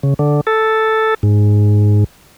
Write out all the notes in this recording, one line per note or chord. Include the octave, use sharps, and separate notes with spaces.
C#3
D3
A4
G#2